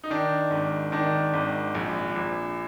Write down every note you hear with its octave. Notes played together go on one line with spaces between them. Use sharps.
D#4
D#3 D4
G#1
D#3 D4
G#1
A#1
A#1